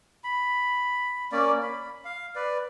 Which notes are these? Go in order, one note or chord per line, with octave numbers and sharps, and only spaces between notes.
B5
A#3 C#4 D5
B5
F5
B4 D5